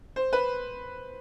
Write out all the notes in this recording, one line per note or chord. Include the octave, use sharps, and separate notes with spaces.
C5
B4